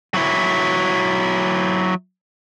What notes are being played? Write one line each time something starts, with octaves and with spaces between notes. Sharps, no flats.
F#3 E4